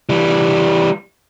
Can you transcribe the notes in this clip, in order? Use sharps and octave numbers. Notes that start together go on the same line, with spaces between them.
E3 G3